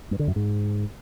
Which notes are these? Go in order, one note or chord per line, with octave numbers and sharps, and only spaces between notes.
G2
D3
F#2
G#2